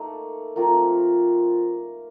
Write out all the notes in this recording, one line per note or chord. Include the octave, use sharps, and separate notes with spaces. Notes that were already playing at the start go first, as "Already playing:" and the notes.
Already playing: A3 A#3 D#4 A4
F3 A3 A#3 C4 F4 A#4